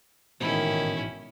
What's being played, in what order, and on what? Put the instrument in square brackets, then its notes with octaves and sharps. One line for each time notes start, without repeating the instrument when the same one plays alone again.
[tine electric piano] A1 G#2 B2 [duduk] D#3 [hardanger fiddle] C#4 E4